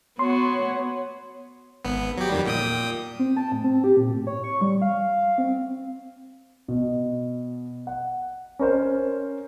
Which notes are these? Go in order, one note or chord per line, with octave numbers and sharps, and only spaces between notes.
B3 F#4 C#5 C6
G#1 B3
F#3 G4
F2 D#3 G3
A#2 G5 D#6
C4
A5
A2
C4
G4
A#2
A2
C#5
C#6
G3
F5
C4
B2
F#5
C#4 A#4 C5